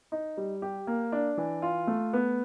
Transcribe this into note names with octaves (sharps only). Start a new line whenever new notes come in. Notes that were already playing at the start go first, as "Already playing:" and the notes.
D#4
G3
G4
A#3
D4
E3
F4
A3
B3